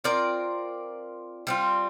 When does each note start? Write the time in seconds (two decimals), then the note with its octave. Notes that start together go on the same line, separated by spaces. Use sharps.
0.04 C4 F4 A#4 D5
1.47 G3 C4 F4